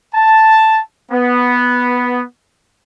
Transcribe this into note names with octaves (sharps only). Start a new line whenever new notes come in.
A5
B3